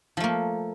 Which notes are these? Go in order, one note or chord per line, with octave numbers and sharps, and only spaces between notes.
F3 A3 A#3